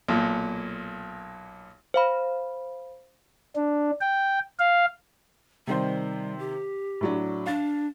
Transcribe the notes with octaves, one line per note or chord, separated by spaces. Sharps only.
B1 A#2
C5 F5 B5
D4
G5
F5
C3 D#3 G3 C5
G4
A2 F#3 D4
D4 F5 A6